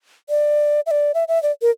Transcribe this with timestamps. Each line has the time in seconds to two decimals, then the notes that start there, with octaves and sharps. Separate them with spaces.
0.29 D5
0.86 E5
0.91 D5
1.14 E5
1.28 E5
1.43 D5
1.62 A#4